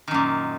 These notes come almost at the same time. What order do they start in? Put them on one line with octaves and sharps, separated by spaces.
D#3 F#2 A#2